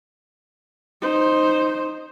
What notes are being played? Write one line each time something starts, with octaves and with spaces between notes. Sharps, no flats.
D#4 C5